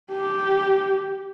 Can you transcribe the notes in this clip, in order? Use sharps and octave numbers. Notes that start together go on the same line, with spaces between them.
G4